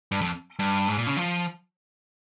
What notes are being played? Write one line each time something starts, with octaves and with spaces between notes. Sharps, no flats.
G2
F2
G2
G#2
A#2
C#3
F3